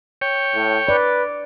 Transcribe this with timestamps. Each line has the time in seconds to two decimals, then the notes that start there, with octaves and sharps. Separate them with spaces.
0.21 C#5 G5
0.54 A2
0.89 B4 D5